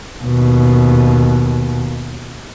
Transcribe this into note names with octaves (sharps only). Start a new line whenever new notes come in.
D#2 B2